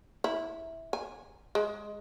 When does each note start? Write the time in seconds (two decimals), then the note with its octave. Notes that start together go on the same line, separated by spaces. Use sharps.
0.24 E4
0.93 G#5
1.55 G#3